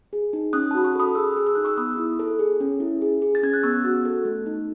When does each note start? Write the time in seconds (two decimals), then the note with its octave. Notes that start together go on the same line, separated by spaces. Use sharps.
0.13 G#4
0.33 D#4
0.53 C#4 D#6 F#6
0.71 A5
0.75 F#4 B5
0.84 A5 C#6
0.95 A4 B5 D#6
1.15 G#4 C#6 E6
1.37 G#4
1.47 E6
1.55 D#4 F#6
1.65 C#6 E6
1.77 B3 B5 D#6
1.98 E4
2.19 A4
2.39 G#4
2.60 C#4
2.80 E4
3.02 G#4
3.22 G#4
3.35 A6
3.43 C#4 G#6
3.53 F#6
3.63 B3 C#6 E6
3.85 F#4
4.05 A4
4.25 A3
4.46 D#4